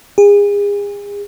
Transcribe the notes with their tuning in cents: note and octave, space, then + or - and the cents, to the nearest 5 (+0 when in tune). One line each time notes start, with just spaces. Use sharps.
G#4 -35